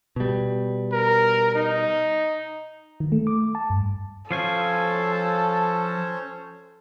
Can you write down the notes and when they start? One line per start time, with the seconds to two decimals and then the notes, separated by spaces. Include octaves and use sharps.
0.16 B2 G3
0.92 A#4
1.55 D#4
3.00 D#3
3.12 A3
3.27 D6
3.55 A5
3.70 G2
4.31 F3 C#4 A4 C5 C#5 F5 G#5